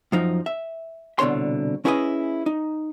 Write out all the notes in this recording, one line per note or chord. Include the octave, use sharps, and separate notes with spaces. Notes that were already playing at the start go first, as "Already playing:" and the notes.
F#2 F3 D#4
E5
C2 B2 D3 C#5 C6
C#4 E4 G#4 B4 C#5 D#5
D#4